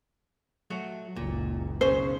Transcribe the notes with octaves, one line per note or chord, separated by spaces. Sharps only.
F#3 A3 F#4
F#1 C#2 A#2
B1 C#3 C#4 C5